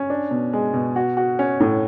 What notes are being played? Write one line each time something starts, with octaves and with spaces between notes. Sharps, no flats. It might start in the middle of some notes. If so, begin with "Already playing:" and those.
Already playing: C#4
D4
B2
G#3
B2
F#4
F#4
C#4
A2